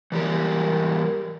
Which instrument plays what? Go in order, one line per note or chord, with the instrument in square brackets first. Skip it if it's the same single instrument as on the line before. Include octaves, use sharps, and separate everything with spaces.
[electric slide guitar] E3 G3 G4 A#4